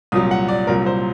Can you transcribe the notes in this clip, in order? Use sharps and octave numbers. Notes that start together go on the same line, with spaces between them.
C2 A#2 F#3 D#6
F#5
D5
C2 A#2 F#3 A#4
C5